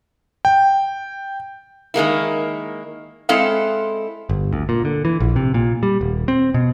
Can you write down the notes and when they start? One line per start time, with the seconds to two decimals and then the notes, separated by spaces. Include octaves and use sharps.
0.45 G5
1.94 D#3 G#3 A#3 E4
3.29 G#3 C4 E4 A4 F5
4.29 G1
4.53 D2
4.69 A#2
4.85 D3
5.05 E3
5.21 A#1
5.36 C3
5.54 A#2
5.83 G3
6.01 D#1
6.28 C4
6.54 B2